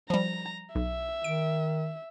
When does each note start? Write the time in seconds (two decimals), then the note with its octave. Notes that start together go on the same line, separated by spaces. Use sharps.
0.10 F3 G3 A#5
0.75 B1 E5
1.24 D#3 D7